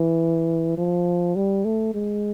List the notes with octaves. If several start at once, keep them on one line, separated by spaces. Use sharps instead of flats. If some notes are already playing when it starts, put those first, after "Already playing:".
Already playing: E3
F3
G3
A3
G#3